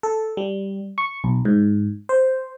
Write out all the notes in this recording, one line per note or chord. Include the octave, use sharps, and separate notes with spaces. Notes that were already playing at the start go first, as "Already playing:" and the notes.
A4
G3
C#6
B1
G#2
C5